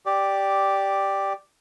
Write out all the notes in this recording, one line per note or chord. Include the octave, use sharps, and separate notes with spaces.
G4 D5